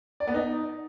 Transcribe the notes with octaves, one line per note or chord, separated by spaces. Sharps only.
D5
B3
D#4